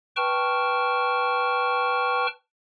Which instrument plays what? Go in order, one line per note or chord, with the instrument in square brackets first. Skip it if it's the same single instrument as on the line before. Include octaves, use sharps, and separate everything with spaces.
[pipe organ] B4 G5 A5 C#6 F6